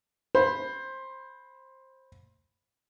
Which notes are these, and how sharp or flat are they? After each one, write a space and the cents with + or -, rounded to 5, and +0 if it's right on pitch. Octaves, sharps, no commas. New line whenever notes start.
C5 +15 B5 +0